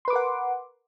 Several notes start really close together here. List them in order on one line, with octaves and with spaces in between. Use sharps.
C6 B4 D6 A#4 F#5